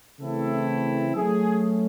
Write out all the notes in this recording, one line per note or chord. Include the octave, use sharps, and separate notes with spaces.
C#3 E3 A3 C4 E4 A4
F#3 A3 C#4 G#4